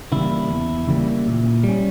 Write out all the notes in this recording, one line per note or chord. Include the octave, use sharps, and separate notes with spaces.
C#3 E3 G3 A#3 E4
E2
C#3 E3 G3 A#3
A#2
G3
C#4